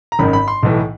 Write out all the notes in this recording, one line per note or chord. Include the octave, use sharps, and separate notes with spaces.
A#5
G#1 F#2 D#3 B5
B5
C6
B1 A2 E3